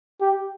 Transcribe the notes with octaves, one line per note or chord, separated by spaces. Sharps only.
G4